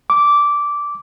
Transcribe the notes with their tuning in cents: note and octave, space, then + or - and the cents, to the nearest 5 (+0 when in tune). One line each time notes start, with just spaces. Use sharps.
D6 -10